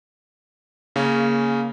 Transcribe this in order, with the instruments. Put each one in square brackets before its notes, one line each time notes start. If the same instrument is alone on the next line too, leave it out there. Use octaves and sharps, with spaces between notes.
[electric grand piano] C#3 C#4 [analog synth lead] A#3